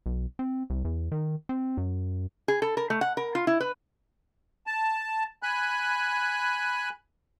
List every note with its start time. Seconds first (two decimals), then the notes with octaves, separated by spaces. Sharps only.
0.06 B1
0.39 C4
0.70 C2
0.85 E2
1.12 D#3
1.49 C4
1.77 F#2
2.48 G#4
2.62 A4
2.77 A#4
2.90 A3
3.01 F#5
3.17 A#4
3.35 F4
3.47 E4
3.60 B4
4.67 A5
5.43 G#5 B5 F#6